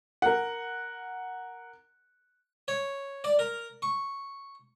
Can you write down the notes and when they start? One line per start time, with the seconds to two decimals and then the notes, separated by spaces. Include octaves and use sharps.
0.22 A#4 F#5
2.68 C#5
3.24 D5
3.39 A#4
3.82 C#6